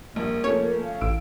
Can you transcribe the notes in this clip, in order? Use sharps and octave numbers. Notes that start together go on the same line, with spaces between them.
A#1 G2 A#3
F3 A3 C#4 C#5
F5
A1 E6 D7